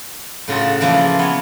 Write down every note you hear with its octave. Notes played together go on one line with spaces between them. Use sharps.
A2 C#3 F4 F#4 A4
C#3 E3 F3 A#3 E4 F4
B3 C#5